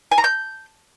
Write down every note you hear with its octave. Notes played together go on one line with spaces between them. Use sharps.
G#5
A#5
G6